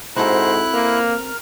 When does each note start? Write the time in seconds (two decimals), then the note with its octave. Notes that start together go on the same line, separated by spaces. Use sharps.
0.16 G#2 C4 E4 F#4 A4 C5 A#5 F#6
0.73 A#3 A#4 F6